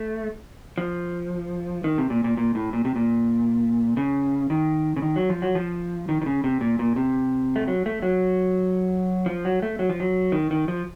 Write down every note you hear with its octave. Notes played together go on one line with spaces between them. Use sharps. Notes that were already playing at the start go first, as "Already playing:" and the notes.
Already playing: A3
F3
D#3
C3
A#2
A#2
A#2
A2
A#2
C3
A#2
C#3
D#3
C#3
D#3
F#3
F3
F#3
F3
D#3
D#3
C#3
C3
A#2
A#2
C3
A3
F#3
A3
F#3
F3
F#3
A3
F#3
F3
F#3
D#3
D#3
F3